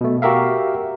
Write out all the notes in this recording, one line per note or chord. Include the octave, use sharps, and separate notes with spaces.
B2 A3
F#4 G4 A#4 E5 F5